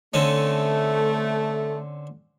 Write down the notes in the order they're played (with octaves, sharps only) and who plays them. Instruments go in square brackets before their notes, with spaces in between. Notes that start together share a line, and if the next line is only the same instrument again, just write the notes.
[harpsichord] D3 C4 C#4 [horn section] A3